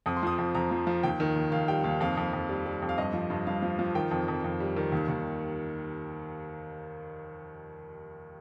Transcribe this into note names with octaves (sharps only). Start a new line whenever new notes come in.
F2 D#6
C6
F3 D#6
F2
F2 A#5
F3
F3
D#2 G5
D#3
D#2
D#2 F5
G3 G5
D#2 F5
F2 F5
F2
F2
G3
G3
F2
F5
G2 D#5
F3
G2
G2 F5
F3
F3
D#3 G5
F2
F2
F2
G3
D#3
D#2
D#2